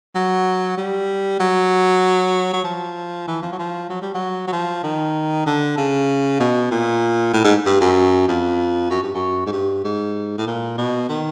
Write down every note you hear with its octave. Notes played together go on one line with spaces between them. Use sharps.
F#3
G3
F#3
F#3
F3
E3
F3
F#3
F3
F#3
G3
F#3
F#3
F3
D#3
D3
C#3
B2
A#2
A2
G#2
G2
F#2
F2
F#2
G2
F#2
G#2
G2
G#2
A2
A#2
B2
D#3